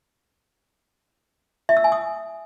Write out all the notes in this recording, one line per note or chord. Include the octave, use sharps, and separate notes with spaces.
E5
E6
G#5
D#6